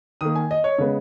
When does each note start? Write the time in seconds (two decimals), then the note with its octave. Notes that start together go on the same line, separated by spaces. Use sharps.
0.21 D#3 A#3 D#6
0.35 G#5
0.51 D#5
0.64 C#5
0.78 C#3 G#3 B3